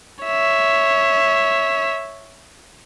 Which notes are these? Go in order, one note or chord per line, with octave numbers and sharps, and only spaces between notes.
C#5 E5